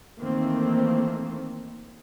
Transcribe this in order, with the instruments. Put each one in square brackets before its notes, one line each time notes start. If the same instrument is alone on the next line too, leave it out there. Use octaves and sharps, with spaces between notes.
[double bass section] D#3 E3 A3 A#3 C4